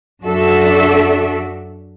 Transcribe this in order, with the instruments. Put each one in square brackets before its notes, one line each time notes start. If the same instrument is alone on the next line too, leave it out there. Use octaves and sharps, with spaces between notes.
[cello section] F#2 D4 F#4 A4 D5 E5